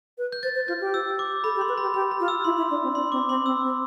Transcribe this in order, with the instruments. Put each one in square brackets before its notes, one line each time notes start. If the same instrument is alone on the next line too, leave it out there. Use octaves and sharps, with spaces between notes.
[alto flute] B4
[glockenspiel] G6
[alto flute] C5 [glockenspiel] A6
[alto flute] C5
[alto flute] F4 [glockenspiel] G6
[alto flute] G4
[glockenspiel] E6
D6
[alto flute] A4 [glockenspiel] B5
[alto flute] G4
[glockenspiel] C6
[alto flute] B4
[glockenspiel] B5
[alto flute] G4
[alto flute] G4 [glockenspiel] B5
[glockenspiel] B5
[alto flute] F4
[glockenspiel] E6
[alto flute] E4 [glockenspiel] C6
[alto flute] E4
D4
C4
[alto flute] D4 [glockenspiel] C6
[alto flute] C4 [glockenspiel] D6
[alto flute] C4 [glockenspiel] C6
[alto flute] C4 [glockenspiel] E6
[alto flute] C4